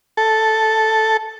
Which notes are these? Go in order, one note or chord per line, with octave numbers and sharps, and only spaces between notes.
A4